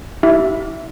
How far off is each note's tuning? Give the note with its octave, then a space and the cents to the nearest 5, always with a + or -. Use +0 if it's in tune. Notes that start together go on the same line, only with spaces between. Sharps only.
E4 -20 G4 -35 E5 +0